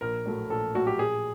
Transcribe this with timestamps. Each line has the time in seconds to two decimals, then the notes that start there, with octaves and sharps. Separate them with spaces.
0.01 A#1 A#4
0.26 A2 F#3 A3
0.50 A#1 A4
0.75 A2 F#3 A3 F#4
0.87 G4
0.99 A#1 G#4